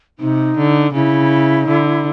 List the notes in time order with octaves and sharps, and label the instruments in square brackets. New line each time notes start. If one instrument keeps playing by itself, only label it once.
[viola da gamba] C3 [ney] D#4
[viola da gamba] D3
[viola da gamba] C#3 [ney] E4
[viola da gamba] D3